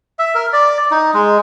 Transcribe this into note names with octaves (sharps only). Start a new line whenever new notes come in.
E5
A#4
D5
D#4
G#3